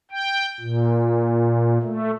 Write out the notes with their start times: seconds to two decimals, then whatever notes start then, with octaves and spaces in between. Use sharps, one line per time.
0.11 G5
0.61 A#2
1.82 A3